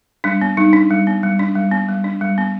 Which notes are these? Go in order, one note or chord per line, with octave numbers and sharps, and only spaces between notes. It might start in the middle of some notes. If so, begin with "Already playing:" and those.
G3 D4
B3
G3 D#4
D4
G3
B3
G3
D4
G3
B3
G3
D4
G3
B3